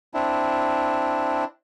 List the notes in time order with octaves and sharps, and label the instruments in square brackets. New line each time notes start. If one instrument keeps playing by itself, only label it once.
[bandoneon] C4 D4 E4